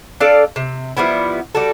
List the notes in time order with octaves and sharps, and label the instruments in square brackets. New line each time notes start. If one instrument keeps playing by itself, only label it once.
[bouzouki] D4 A4 D5 F5
C3
F3 G3 B3 E4
G3 F#4 A4